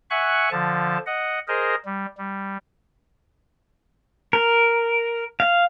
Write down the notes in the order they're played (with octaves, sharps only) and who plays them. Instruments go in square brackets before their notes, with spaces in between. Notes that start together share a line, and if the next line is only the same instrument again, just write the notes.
[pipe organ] E5 F#5 G#5 C#6 F#6
D3 F3 A5
D#5 F#5
G#4 A#4 C5 D#5
G3
G3
[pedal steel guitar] A#4
F5